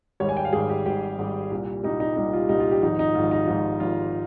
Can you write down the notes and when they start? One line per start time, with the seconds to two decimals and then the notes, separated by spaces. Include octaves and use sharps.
0.20 G#1 G#2 G3 C#5
0.29 G#5
0.37 G5
0.45 F5
0.53 G#1 G#2 G3 G#4
0.70 G4
0.86 G#1 G#2 G3 G4
1.18 G#1 G#2 G3
1.51 C2 A#2 G3
1.84 C2 A#2 G3 D#4
2.00 D#4
2.16 C2 A#2 G3 D#4
2.33 F4
2.49 C2 A#2 G3 D#4
2.60 F4
2.71 G4
2.82 G#1 G#2 F3 D#4
2.99 D#4
3.15 G#1 G#2 F3 F4
3.31 D#4
3.42 F4
3.47 G#1 G#2 F3 D#4
3.80 G#1 G#2 F3 F4